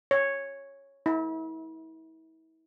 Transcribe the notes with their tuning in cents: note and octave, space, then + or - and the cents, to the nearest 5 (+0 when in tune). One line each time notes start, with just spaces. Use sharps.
C#5 -5
E4 -40